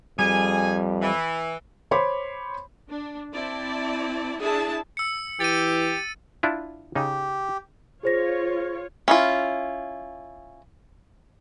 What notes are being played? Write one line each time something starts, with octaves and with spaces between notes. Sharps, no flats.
F2 G3 G#4 G#5
E3
C5 C#5 B5 C6 D6
D4
C4 E4 D5 A5
D4 E4 G#4 E5 A5
E6 C#7
E3 G4 A6 D#7
D4 E4 F4
C#3 D#4 G4
F4 G#4 C5 C#5 A#6
C#4 E4 F4